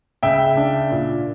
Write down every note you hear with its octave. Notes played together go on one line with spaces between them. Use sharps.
C#3 E5 G5
D4
A#2